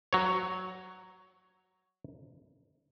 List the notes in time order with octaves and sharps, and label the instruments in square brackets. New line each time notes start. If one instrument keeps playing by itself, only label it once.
[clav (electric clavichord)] F#3 C#5